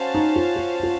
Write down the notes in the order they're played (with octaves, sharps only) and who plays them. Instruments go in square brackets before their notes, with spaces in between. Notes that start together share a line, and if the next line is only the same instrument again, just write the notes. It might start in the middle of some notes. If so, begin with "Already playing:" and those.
Already playing: [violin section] C#4 F#4 C5 F5 A5
[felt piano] D#4
F4
F4
F4